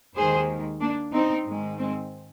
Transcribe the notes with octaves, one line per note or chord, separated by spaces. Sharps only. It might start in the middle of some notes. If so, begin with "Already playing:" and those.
D#2 D#3 G#3 G#4 C5
A#3 D4
C4 D#4
G#2 D#3 G#3
G#3 C4